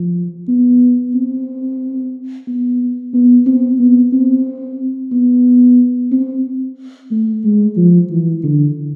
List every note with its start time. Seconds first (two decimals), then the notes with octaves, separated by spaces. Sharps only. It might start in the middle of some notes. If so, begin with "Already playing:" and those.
Already playing: F3
0.48 B3
1.15 C4
2.47 B3
3.13 B3
3.46 C4
3.79 B3
4.13 C4
5.12 B3
6.12 C4
7.11 A3
7.44 G#3
7.77 F3
8.10 E3
8.43 D3